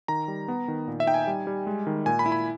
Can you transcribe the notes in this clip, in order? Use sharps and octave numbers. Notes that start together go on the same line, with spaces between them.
D#3 A#5
G3
B3
D#3
A#2
E5
D#4 G5
G#5
G3
G3
G#3
D#3
A#2 G#5
B5
E4
B5